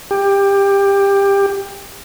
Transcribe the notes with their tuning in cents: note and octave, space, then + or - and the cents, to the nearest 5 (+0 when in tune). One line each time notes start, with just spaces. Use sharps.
G4 +20